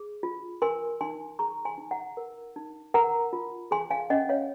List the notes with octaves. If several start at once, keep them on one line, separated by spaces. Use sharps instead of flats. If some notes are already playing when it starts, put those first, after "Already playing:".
Already playing: G#4
F4
A#4 G#5 C6
D#4 G#5 C6
G#4 A#5 C#6
G#5 C6
D#4
F#5 A#5
A#4
D#4
A#4 F#5 A#5
F4
G#4 G#5 C6
F5 G#5
C#4 D#5 F#5
C#5 F5